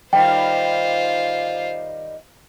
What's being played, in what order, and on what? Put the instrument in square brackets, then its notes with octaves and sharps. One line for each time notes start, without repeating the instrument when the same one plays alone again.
[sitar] D#3 G3 [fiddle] F4 C5 [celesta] G5